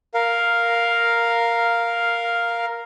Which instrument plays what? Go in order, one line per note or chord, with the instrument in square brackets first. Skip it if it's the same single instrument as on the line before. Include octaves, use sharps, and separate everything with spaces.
[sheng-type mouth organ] A#4 F5